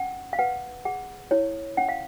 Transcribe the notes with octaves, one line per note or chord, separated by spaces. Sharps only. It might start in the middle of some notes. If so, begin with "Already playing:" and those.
Already playing: C#4 F#5
F5
B4 F#5
G#4 F#5
E4 C#5
C#4 F#5
F5